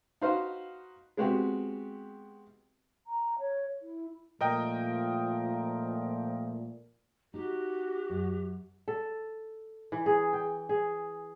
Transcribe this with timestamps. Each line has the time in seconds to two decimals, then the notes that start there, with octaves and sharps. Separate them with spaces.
0.22 D#4 F#4 B4 C5 F5
1.17 G#3 B3 C4 F#4 G4
3.07 A#5
3.39 C#5
3.82 E4
4.41 A#2 F3 A3 A#4 D#5 G5
7.34 D#4 F#4 G4
8.10 F#2
8.88 A4
9.92 E3
10.06 G#4
10.33 G5
10.69 G#4